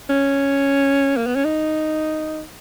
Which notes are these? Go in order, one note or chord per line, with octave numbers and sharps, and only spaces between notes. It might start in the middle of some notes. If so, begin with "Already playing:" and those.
C#4
A#3
B3
C#4
D#4